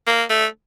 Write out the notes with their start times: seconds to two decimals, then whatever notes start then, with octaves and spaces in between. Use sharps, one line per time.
0.07 A#3
0.30 A3